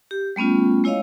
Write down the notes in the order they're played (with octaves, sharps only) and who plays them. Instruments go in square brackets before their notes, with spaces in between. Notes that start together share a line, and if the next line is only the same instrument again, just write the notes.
[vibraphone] G4
G3 A3 B3 C#4 F4
G#3 E4 C#5 D#5 F5